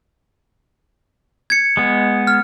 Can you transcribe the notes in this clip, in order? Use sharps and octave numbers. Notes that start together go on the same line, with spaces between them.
G#6 C#7
G#3 B3
F6